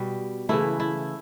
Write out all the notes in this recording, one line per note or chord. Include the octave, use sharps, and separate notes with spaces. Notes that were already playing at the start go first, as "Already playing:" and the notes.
Already playing: B2 G3
C#3 E3 A3 E4
E4